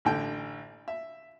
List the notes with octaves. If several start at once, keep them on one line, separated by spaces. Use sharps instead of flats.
A1 D3 G5
E5